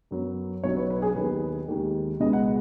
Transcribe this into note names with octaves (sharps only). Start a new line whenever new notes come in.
F#2 F#3 B3
B1 B2 F#3 C#5
B4
B4
G#4
D#2 D#3 B3 B4
D#2 D#3 G#3
C#2 B2 G#3 B3 D#5
F#5